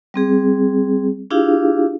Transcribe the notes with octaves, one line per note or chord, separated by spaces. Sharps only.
G3 C4 G#4
D4 E4 F4 G4 G#4 F5